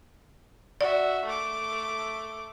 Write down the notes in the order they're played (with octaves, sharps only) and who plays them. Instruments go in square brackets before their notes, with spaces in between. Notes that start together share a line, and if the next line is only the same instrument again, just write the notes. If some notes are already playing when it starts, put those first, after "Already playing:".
[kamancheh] F#4 E5 [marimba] D5
[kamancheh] A3 D6